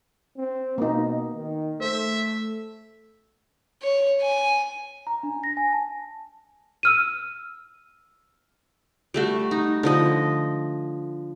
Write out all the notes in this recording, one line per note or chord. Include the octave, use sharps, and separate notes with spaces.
C4
B2 A#3 D#4
D#3
A3 C5 E5
C#5
G#5
A#5
D4
A#6
G#5
A5
E6 F6 D#7
G3 A3 F#4
D#4
D3 F3 D#5